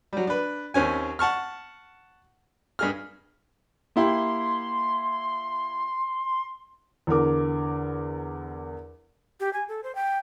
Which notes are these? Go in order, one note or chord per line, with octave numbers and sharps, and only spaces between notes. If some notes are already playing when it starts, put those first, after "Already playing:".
F#3 G3
D4 B4
D#2 C4 C#4 G#5
F#5 A5 C#6 F6
G2 G#4 F6
A#3 E4 G4 C6
E2 D3 A#4 D6
G4
G#5
A4
C5
G5